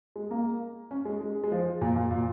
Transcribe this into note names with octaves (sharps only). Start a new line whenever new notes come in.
G#3
A#3
C#4
G#3
G#3
G#3
F3
A#2
A#2
A#2